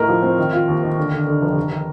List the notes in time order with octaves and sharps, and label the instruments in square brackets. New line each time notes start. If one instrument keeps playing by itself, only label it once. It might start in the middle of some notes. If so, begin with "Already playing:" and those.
Already playing: [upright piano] A2 D#4 [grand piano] A#4
[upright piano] F3
C4
D#3
F4
D#2
D#3
D3
D3
D3
F1
D#3
D#3